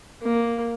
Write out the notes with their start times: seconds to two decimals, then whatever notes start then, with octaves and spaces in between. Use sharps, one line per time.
0.22 A#3